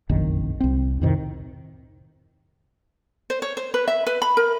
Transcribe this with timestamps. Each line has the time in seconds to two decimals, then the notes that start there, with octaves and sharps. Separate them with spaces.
0.09 F1 A#1 F#2 D#3
0.60 C2 C4
1.01 F2 A2 C3 D#3
3.30 C5
3.42 C#5
3.57 C5
3.74 B4
3.88 E5
4.07 B4
4.22 B5
4.37 A#4